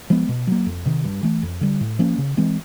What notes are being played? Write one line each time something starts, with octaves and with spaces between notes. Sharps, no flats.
F3 G#3 B3
B2
F#3 A#3
F2
C3 D#3
G2
E3 A3
F2
D3 G3
A2
F3 A#3 C#4
C#3
E3 G#3 C4